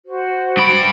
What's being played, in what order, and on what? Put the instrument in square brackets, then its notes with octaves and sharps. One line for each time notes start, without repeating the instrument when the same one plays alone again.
[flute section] F#4 C5
[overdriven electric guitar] G2 B5 [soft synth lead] D7